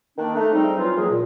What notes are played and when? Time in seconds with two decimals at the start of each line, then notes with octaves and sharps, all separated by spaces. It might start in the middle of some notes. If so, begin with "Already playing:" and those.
0.18 D#3 A#3 D4
0.35 A3 D#4
0.52 G#2 F3 G3 C4 D#4
0.78 E3 F#3 F4
0.97 C#2 D#3 F3 G#3 A#3 G#4
1.11 A#2